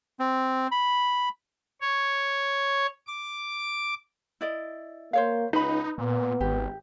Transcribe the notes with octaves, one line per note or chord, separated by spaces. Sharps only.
C4
B5
C#5
D6
E4 D5 D#5
A#3 C5 C#5 F5
C#2 D#4 B4 B5
A#2 B3
G#1 G4